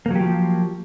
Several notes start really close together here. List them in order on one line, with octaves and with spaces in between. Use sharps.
A#3 F#3 G4 F3